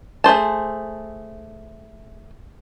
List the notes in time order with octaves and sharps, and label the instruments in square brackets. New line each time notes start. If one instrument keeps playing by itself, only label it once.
[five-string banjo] A3 G#4 C5 A5